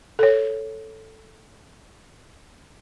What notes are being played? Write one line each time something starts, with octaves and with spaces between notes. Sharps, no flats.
A4 C#5